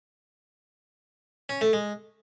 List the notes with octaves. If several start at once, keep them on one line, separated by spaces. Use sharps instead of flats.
C#4
A3
G#3